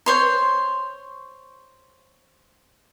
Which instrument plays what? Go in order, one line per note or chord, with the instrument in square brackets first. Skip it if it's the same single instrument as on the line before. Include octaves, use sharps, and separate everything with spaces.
[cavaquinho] C5 C#5 C6